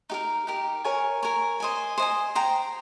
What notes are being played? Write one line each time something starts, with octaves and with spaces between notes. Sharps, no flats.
D#4 G4 A#4
D#4 G4 A#4
A#4 C#5 G#5
A#4 C#5 G#5
C5 D#5 G#5
C5 D#5 G#5
C5 G5 A#5